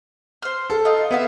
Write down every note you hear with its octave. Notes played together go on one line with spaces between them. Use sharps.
C5 F6
A4
D#4 F4
B3 E4 E5 F5